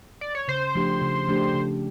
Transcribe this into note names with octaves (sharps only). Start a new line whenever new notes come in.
D5
C#5
C#3 C5
F3 A3 D4 G4
C#3
F3 A3 D4 G4
C#3